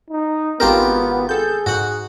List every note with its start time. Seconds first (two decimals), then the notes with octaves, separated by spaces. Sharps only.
0.10 D#4
0.60 G#1 B3 C4 F4 G4 A#4
1.29 G#4 A4 G6
1.66 G#2 F#4 F#5